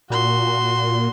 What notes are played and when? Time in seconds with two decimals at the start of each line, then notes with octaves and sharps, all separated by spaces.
0.10 A#2 F#4 C6